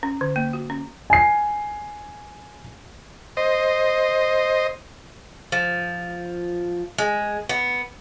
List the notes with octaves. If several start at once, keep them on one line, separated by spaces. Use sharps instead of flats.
C#4
D3
A#3
F#4
C#4
G#5 C7
C5 D#5
F3
G#3
B3